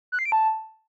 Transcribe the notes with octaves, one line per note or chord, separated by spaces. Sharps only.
F#6
C7
D7
A5